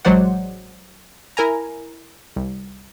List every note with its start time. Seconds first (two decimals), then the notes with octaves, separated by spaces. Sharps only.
0.05 A1 F#3 G#3 C5 D5 F#5
1.37 E4 A#4 G#5 A#5
2.36 C2